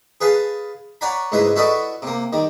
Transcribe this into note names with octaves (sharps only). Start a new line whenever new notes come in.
G#4 B4 F5 G#5 A5
C#5 D5 F#5 G#5 A#5 B5
C#2 G#2 E4 B4 D#5
E4 F#4 A4 B4 D5 D#5
C3 A#3
D#3 G3